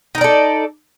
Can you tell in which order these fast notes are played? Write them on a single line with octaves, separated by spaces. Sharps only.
D#4 A#4 D5 A4